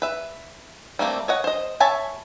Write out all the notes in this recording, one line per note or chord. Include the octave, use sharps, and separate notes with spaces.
B4 E5
G3 A3 A#3 C4
C#5 D#5 F#5
C5 D#5
C#5 E5 G#5 A5 B5